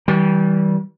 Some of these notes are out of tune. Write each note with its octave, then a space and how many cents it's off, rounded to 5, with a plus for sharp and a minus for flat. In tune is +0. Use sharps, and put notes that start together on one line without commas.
E3 -40 G3 -20